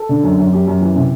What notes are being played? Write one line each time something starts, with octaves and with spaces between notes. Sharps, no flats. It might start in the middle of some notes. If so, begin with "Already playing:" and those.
Already playing: A4
D3
F#2
F#2
F#2 G4
F#2
E3
C3